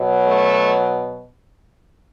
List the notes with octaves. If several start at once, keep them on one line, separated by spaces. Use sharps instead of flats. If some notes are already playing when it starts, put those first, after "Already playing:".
Already playing: B2 F#3
A3